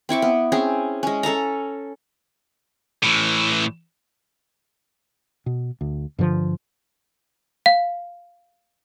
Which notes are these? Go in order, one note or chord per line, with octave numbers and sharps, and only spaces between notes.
C4 E4 C#6 D6
B3
C4 C#4 G#4
G#3 C#4
C#4 A4 A5 A#5
A2 E3
B2
D2
G2 D3 F3
F5